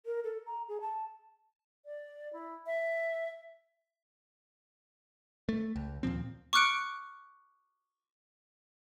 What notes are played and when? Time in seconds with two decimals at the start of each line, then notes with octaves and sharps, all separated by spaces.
0.06 A#4
0.24 A4
0.46 A#5
0.68 G#4
0.81 A5
1.85 D5
2.33 E4
2.66 E5
5.49 A3
5.76 C#2
6.03 D#2 A#2 F3 C4
6.53 C#6 D6 F6 F#6 C#7 D7